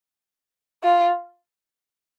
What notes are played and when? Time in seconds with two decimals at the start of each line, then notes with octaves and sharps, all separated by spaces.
0.84 F4